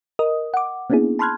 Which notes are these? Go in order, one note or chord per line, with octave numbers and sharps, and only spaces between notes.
A#4 D#5 D#6
F#5 D6
A#3 B3 C#4 D4 E4 G#4
A5 B5 C6 F6 F#6 G#6